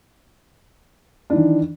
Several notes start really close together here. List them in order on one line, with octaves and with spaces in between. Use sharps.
D4 E3 D#3